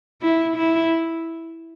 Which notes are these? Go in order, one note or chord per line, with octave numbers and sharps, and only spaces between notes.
E4
E4